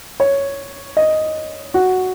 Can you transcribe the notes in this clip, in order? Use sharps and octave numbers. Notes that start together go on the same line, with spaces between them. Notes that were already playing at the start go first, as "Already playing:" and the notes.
C#5
D#5
F#4